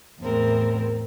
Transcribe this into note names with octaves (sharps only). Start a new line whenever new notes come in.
E2 A2 C4 A#4